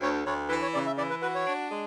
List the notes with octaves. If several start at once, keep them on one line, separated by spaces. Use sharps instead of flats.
D2 C#5
D2 C#5
E3 B4
C#5
C#3 D5
E5
E3 D5
B4
F#4 B4
C#5
D4
G#3